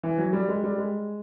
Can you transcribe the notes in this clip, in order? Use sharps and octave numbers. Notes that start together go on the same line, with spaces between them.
E3
F#3
G3
G#3
G3
G#3